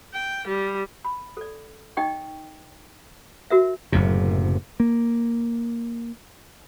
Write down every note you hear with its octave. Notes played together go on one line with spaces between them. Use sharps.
G5
G3
B5
A4 D5
D#4 D#5 G5 C#6
F#4 A#4 E5
F#1 F#2 A2 C3
A#3